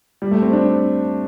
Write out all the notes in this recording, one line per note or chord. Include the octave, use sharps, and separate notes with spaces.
G3
A3
C4
D4